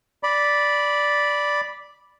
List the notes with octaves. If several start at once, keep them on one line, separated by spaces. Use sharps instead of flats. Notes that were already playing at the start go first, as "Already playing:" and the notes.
D5 B5